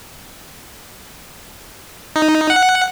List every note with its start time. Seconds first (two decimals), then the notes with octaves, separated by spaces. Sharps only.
2.16 D#4
2.50 F#5